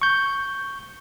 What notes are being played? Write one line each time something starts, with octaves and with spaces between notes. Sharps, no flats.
C#6 G6